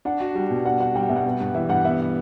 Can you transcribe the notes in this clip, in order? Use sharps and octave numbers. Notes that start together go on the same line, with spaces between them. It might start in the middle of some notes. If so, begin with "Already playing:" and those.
D4 F#5
F#4
G3
B2
D4 F#5
F#4 F#5
G3 G5
F#5
B2 E5
F#5
B3
G2
E3 E5
G2 F#5
B3 E5